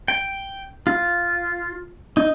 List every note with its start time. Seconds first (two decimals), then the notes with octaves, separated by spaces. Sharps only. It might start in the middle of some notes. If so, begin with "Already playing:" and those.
0.08 G5
0.87 F4
2.17 D#4